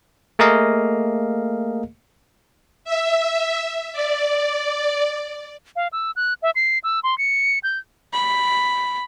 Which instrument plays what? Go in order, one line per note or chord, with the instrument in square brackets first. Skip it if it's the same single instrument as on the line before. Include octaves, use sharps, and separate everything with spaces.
[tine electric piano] A3 A#3 G#4 A#4 D#5 F5
[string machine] E5
D5
[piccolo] F5
E6
F#6
E5
C7
E6
C6
C#7
G6
[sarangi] B5